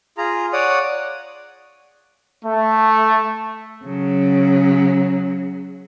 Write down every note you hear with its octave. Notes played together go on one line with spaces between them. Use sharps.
F4 G#4 A#5
C#5 D5 F#5 D#6
A3
C#3 F#3